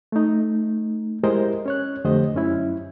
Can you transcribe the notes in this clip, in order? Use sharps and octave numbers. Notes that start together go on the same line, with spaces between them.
A3 D#4
G#3 E4 G4 A#4 C5 D#5
C#4 C#5 F#6
F2 D3 A3 G4 C5 D#5
F#2 C#4 E4